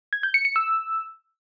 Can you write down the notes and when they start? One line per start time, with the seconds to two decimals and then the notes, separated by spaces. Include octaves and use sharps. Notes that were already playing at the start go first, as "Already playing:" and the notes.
0.13 G#6
0.23 G6
0.34 C#7
0.45 C#7
0.56 E6